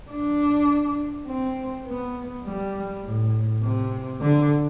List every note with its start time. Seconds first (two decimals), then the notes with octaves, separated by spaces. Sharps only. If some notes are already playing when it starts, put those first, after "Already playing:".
0.11 D4
1.27 C4
1.87 B3
2.44 G3
3.04 A2
3.63 C3
4.21 D3